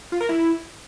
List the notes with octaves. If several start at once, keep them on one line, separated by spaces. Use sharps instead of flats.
F4
A#4
E4